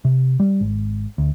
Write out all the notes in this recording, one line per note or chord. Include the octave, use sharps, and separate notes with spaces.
C3
G3
G#1
D2